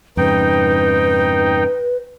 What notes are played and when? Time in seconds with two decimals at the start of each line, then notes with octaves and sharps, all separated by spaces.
0.17 F2 G#2 C#3 D#4 B4 G5